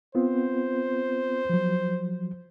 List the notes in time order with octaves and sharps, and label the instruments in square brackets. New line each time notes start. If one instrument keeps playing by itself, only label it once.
[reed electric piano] B3 C4 F4 [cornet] C5
[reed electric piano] F3 F#3